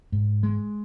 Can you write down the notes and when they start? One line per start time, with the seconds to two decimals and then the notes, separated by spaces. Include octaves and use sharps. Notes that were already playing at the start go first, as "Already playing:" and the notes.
0.12 G#2
0.43 G#3